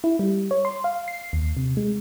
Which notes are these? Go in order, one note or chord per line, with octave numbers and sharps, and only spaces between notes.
E4
G3
C#5
C6
F5
C7
D#2
C3
G#3